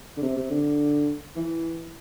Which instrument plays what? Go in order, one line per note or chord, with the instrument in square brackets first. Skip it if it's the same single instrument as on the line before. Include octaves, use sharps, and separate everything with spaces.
[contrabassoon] D3
C3
C3
D3
E3